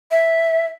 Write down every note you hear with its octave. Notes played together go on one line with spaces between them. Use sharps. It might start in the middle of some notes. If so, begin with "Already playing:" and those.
E5